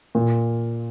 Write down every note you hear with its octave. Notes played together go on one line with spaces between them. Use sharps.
A#2